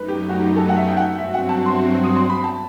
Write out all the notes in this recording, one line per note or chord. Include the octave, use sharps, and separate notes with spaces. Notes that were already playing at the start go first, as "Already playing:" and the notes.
Already playing: F#2 F#3 A3 D#4 B4
G4
F#4
G4
A4
F#5
E5
G5
F#5
G2 F#3 C4 F#4 E5
F#5
A5
C6
D#6
C6
B5
A5